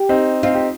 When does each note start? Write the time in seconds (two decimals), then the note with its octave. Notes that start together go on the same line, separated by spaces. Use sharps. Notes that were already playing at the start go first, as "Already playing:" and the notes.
Already playing: G4
0.09 C4 D#4
0.43 C4 D#4 F4
0.55 G4